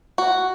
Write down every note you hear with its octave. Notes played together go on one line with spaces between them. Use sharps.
F#4